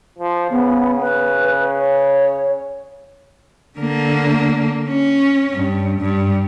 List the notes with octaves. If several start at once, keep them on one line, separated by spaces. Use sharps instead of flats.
F3
C#3 B3
B4
C#5
D3 A#3
C#4
G2
G2